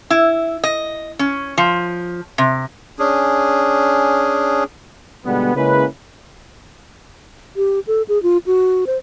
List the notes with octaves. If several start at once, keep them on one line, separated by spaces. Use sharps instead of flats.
E4
D#5
C#4
F3
C3
C#4 D4 G#4
B2 D3 G3 G#3 B3
C#3 G#3 A#3 C#4 E4 B4
G4
A4
G#4
F4
F#4
C5